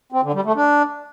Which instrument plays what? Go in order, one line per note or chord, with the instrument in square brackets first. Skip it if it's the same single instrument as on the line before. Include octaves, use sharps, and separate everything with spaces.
[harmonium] C4
D3
G3
A3
D4